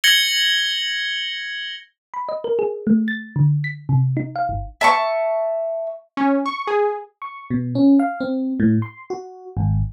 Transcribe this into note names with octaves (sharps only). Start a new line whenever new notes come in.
G#6 A#6 C#7 F#7 G7
B5
D#5
A#4
G#4
A3
A6
D3
B6
C3
D#4
F5
G1
E5 A5 C#6
C#4
C#6
G#4
C#6
B2
C#4
F5
C4
A2
C6
F#4
G#1